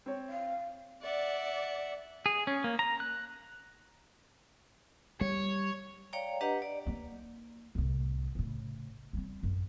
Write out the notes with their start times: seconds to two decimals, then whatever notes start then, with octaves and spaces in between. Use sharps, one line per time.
0.06 C4 C#5
0.29 F5
1.01 D5 E5 F#5
2.26 G#4
2.47 C#4
2.64 A#3
2.79 A#5
3.00 F#6
5.21 G3 C#5
6.13 C#5 D5 F5 G5 A#5
6.41 D4 G4 B4 D#5 F#5 A#5
6.62 D5
6.87 A#3 D#4
7.75 C2 A2
8.35 A2 C#3
9.13 G3 C4
9.43 A1 F#2